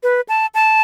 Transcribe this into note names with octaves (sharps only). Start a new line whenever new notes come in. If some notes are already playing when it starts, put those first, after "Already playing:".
B4
A5
A5